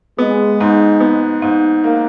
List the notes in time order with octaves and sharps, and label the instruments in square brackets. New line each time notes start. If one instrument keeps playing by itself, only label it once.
[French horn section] G#3 [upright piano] B3
[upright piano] G#2
B3
G#2
A#3